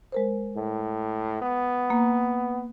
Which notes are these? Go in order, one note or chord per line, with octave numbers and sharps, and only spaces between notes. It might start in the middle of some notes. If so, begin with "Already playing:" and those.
G#3 A#4 C5
A2
B3
A#3